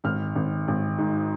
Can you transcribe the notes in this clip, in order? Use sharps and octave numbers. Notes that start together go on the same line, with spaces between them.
G#1 F6
G#1
G#1
G#2